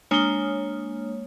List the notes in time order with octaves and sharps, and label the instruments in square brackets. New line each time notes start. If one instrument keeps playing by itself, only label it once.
[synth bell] G#3 A#3 C#5 [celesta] D4 G7